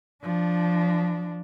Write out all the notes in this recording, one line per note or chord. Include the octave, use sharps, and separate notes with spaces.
F3 D4